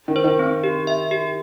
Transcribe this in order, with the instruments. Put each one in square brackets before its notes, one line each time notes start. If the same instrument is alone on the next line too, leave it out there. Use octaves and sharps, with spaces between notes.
[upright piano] D#3
[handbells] C5
[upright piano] D#3
[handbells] C4
G4
E5
G4